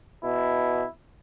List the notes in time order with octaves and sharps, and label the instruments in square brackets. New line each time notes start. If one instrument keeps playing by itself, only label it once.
[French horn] B2 [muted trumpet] E4